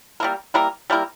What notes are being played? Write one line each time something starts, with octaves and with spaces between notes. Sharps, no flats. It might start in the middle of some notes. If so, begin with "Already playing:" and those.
G3 A#3 E4 A#4
G3 A#3 E4 A#4
G3 A#3 E4 A#4